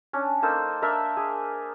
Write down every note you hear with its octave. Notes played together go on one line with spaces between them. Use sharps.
C#4 D4
A#3 D#4 A4 C5
D4 A#4 D5 E5
G#4